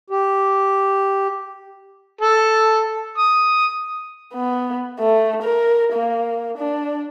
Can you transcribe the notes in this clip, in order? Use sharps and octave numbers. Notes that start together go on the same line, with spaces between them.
G4
A4
D#6
B3
A3
A#4
A#3
D4